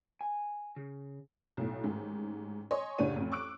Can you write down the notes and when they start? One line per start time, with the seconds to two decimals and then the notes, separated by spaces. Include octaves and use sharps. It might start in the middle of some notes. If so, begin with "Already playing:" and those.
0.21 G#5
0.76 C#3
1.57 B1 A2
1.84 A1 G#2 D#3
2.71 C#5 D#5 G#5 C6
2.98 F#1 A2 D4 G4 C#5 D#7
3.16 A1 F2
3.32 C#6 D6 E6 F#6 D7